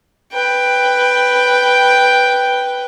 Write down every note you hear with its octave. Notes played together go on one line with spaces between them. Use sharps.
B4 G5